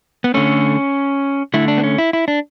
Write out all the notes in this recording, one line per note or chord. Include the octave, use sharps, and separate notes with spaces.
B3
D3 A3 C#4
D3 A3 E4
D4
B3
C#4
E4
E4
D4